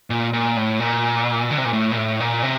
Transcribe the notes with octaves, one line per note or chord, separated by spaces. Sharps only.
A#2
A#2
A2
A#2
D3
C3
A#2
A2
A#2
A2
A#2
C3